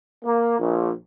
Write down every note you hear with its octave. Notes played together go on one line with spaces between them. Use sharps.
A#3
A#1